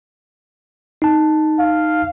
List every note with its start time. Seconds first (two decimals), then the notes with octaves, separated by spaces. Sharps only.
1.02 D#4 A5
1.59 F5